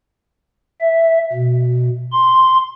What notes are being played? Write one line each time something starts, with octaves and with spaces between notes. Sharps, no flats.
E5
B2
C6